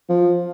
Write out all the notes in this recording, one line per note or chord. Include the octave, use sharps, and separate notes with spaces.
F3